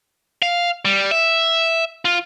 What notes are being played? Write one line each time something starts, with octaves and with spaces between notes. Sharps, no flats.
F5
G3
E5
F4